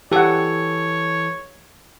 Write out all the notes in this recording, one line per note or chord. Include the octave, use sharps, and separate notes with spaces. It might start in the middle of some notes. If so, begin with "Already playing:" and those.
E3 G4 A4 C#5 F#5